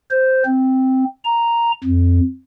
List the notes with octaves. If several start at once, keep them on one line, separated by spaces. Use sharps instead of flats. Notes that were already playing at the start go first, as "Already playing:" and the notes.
C5
C4
A#5
F2